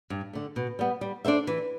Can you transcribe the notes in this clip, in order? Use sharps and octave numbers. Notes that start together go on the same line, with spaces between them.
G2
D3 A3
B2
G3 B3
G3
D4 A4 C5 E5
E3